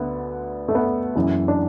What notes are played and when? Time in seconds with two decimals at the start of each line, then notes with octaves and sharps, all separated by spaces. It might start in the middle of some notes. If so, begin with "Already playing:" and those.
Already playing: D2 D3 B3
0.68 A3
0.75 B3
1.16 F#1 F#2 E3
1.48 D4